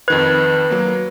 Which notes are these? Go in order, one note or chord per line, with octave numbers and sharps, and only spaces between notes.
F2 D#3 B4 G#6
F#3 A#3